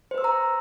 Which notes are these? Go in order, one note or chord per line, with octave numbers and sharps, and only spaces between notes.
B4 C5 A#5 C6 E6